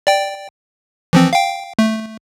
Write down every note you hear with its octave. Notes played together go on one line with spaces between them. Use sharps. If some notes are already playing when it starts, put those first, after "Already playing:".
D5 G5
E3 F3 C4
F5 G5
A3